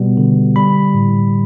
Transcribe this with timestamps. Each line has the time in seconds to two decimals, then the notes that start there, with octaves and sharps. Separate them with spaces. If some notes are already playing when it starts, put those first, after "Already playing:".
Already playing: B2 G3 B3
0.17 D3
0.56 G3 B5
0.94 A2